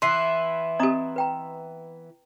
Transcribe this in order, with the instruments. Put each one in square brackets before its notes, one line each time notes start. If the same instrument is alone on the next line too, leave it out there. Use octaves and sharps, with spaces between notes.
[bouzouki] E3 B3 E4 [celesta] C6 F#6 C7
[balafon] C4 G4 [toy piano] D#5 A#5 D#6
[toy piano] B4 G5 A#5